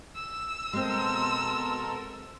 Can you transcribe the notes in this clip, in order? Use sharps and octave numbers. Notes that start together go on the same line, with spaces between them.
E6
B2 G#3 C4 A4 A#4 C6